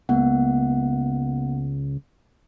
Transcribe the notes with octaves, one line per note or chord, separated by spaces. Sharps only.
C#2 A#3 B3 F#5